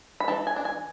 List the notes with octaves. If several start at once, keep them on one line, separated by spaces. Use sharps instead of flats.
B5
E3 A5
G#5
D4
G#5